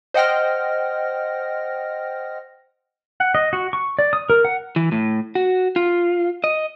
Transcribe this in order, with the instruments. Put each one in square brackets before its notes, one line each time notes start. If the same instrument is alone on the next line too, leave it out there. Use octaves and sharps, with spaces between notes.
[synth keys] C5 D#5 F#5 G5 F6 A#6
[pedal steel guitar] F#5
D#5
F#4
C#6
D5
D#6
A#4
F#5
[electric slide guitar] E3
A2
F#4
F4
D#5